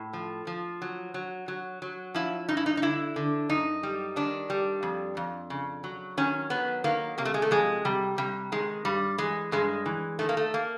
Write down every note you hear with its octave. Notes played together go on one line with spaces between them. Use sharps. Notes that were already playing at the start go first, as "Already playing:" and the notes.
Already playing: A2
F3
F3
F#3
F#3
F#3
F#3
F3 E4
G2 D#4
E4
D#4
D#4
D3 E4
D3
F#2 D#4
G3
D#3 D4
G3
F2
F2
C#3
F#3
D#3 C#4
F#3 B3
D#3 A#3
C3 A#3
A3
G#3
A3
F2 G#3
C3 G3
C3 G3
D#3 G#3
G2 G3
E3 G#3
G2 G#3
E3
D#3 A3
A#3
A3
A#3